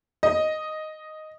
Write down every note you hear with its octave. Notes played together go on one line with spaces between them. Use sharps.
D#5